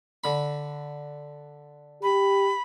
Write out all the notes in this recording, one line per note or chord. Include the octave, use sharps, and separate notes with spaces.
D3 B5
G4 B5